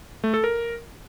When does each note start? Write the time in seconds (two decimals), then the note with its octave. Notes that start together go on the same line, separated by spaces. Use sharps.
0.24 A3
0.34 A4
0.44 A#4